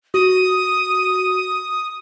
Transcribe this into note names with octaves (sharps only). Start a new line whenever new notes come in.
F#4 D#6